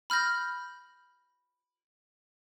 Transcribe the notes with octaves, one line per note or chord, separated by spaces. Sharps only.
B5 F6 G6 A#6